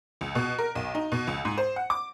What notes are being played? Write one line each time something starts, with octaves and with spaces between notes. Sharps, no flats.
C#2
B2
A#4
B1
D#4
B2
C#2
G#2
C5
F#5
D6